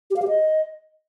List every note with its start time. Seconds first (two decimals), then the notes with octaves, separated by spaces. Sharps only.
0.10 G4
0.16 F5
0.22 G4
0.28 D#5